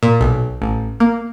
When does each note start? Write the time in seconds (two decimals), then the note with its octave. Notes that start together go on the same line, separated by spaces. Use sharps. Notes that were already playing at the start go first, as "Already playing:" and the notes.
0.03 A#2
0.21 B1
0.62 A1
1.00 A#3